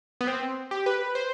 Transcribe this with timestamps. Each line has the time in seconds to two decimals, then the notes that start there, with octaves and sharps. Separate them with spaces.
0.21 B3
0.27 C4
0.71 G4
0.86 B4
1.15 C5